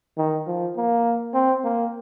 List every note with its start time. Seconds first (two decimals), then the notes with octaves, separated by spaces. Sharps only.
0.17 D#3
0.47 F3
0.77 A#3
1.34 C4
1.64 A#3